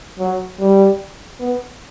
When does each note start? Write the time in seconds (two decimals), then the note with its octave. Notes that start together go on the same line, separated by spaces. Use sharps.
0.19 F#3
0.60 G3
1.40 B3